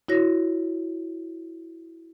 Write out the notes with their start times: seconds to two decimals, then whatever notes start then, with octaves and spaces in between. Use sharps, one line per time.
0.08 E4 F#4 C#5 A#6